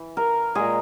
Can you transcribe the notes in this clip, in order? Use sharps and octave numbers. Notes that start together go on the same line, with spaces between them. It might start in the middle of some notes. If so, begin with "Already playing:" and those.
Already playing: E3
A#4
A#2 G#3 G#4